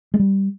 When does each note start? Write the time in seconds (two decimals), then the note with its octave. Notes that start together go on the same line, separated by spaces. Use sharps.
0.14 G#3
0.19 G3